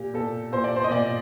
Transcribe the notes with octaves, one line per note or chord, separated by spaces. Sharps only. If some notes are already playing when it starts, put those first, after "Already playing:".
Already playing: A#2 G4
A#2 A4
A#2 C5
D5
C5
D#5
A#2 D5